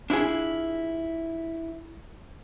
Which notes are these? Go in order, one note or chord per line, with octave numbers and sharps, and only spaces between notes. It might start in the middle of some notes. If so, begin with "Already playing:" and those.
D4 E4 F4 G#4